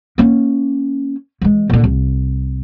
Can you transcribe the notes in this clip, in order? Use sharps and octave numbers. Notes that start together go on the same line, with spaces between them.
A#3 C#4
E3 G#3
A#2 D3
C2